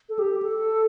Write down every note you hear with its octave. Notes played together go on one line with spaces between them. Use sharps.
A4
G4
A4